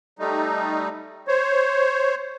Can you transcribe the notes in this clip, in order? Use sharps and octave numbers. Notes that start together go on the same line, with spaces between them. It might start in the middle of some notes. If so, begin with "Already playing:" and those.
G3 A3 D#4
C5 C#5